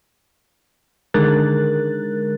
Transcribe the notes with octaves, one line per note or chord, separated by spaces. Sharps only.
D3 D#3 G#3 A#4 F#6 A6